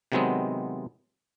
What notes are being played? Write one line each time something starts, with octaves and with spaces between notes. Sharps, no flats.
C3 D#3 F#3 G#3 B3 C4